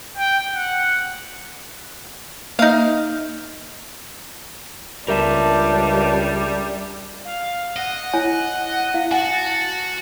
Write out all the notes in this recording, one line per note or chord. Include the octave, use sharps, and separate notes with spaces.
G5
F#5
A#3 D#4 E5 F5 F6
C#2 G3 D4 A#4 E5 A5
F5
D#5 F#5
E4 C#5 G#5
E4 F5
F#4 F#5 G#5 A5